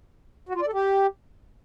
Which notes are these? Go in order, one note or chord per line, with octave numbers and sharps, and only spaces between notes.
F#4
F4
D5
A4
G4